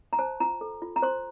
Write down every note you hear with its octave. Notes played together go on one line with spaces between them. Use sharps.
A#5
C5 A5
F4 A#5
A4
F4
A#5
C5 C6